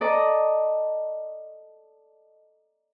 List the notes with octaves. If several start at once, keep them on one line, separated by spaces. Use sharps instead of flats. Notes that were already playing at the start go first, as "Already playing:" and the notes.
A4 D5 D#5 A#5